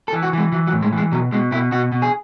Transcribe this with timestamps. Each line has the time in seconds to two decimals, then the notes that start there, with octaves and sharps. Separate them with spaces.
0.08 A4
0.12 E3
0.23 F#4
0.33 E3 G#3
0.52 E3 F#3
0.67 F#3
0.73 A2
0.83 G#3
0.93 E3 G#3
1.12 B2 F#3
1.32 B2 G#3
1.52 B2 E4
1.72 B2 F#4
1.92 B2
2.02 G#4